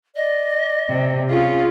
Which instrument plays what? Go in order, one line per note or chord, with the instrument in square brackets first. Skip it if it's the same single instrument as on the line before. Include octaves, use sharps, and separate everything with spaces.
[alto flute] D5 [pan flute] D#5
[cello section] C3
[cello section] C#4 F4 [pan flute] G#4